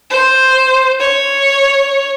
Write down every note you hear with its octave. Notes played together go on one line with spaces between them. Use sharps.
C5
C#5